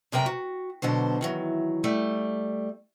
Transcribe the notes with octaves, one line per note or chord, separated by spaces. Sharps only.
F#2 C3 A#4 G5 A#5
F#4
B2 D3 F#3 C5
D#3 E3 F#3
G3 A3